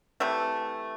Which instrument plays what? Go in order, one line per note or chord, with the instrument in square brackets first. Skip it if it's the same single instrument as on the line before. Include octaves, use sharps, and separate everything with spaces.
[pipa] C3 E3 A3